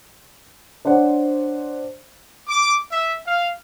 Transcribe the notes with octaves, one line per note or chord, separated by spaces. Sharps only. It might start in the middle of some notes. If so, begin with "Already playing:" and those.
D4 C5 C#5 F#5
D6
E5
F5